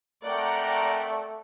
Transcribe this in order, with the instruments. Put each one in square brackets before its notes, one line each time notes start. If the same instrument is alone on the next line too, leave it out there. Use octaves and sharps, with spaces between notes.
[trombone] A3 [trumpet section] C4 A#4 A#5 [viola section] D5 F#5 G5